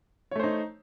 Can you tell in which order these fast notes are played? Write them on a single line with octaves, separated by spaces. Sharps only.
C#5 A3 C5 D#4